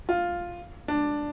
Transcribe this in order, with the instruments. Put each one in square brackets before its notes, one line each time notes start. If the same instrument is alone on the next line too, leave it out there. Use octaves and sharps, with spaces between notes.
[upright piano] F4
D4